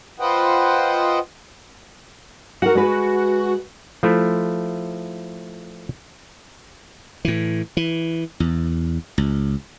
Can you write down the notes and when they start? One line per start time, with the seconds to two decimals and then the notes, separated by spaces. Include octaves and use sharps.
0.20 F4 B4 C5 D#5 F#5 G5
2.62 F#4 A#4 F#5
2.75 G#3 B4
4.03 F3 A3 E4
7.25 A2 E3
7.77 E3
8.40 E2
9.18 C#2